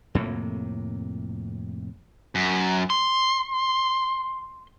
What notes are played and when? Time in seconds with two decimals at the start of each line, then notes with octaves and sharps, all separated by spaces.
0.15 F2 A2 C3 A#3
2.35 F#2
2.90 C6